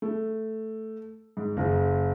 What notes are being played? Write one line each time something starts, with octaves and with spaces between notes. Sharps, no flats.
A3
G#2
F#1